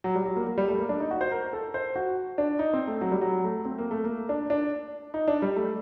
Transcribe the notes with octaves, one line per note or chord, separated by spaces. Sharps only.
F#3
G3
F#3
A#3
A#3
G3
A3
A#3
D4
D#4
F#4
C5
A#4
A4
C5
F#4
D4
D#4
C4
A3
F#3
G3
F#3
A3
C4
A#3
A3
A#3
D4
D4
D#4
D4
G3
A3